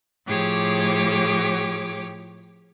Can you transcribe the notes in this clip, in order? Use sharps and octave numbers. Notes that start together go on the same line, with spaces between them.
A2 F3 G4 G#4 C#5 D6